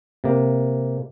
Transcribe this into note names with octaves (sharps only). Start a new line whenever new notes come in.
C3 A#3